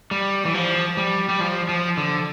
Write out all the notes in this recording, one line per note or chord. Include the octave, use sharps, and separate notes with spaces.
G3
E3
F3
G3
G3
F3
F3
D3